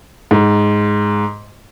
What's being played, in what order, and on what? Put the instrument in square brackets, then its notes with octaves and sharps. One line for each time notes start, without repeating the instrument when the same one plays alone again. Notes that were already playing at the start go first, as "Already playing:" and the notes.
[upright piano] G#2